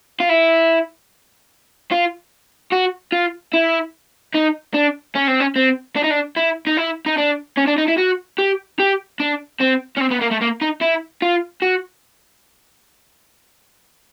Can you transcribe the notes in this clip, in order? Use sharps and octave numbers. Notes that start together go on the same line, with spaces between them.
F4
E4
F4
F#4
F4
E4
D#4
D4
C#4
C4
C#4
C4
D4
D#4
D4
E4
D#4
E4
D#4
D4
C#4
D4
D#4
E4
F#4
G4
G4
D4
C4
C#4
C4
B3
A#3
A3
A#3
D#4
E4
F4
F#4